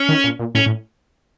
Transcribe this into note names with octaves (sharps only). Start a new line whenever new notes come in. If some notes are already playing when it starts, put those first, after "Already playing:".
Already playing: C#4
D#3
A#2
A#2
A2 C#4
A2